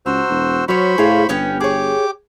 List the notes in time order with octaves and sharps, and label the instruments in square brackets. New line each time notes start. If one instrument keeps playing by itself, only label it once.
[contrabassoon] C#2 [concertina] F#4 C5 E6 [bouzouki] A#5
[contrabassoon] E1
[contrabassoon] F#3 [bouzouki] C#4 C#5 [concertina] C5 B5 C#6
[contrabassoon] A2 [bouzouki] G#4 F5
[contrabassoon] G1 [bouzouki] B3 C#4 G4
[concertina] G4 D6 [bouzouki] G#4 C#5